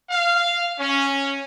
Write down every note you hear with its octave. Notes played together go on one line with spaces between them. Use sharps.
F5
C#4